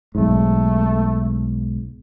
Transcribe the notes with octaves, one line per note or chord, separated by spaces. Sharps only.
B1 G#2 A3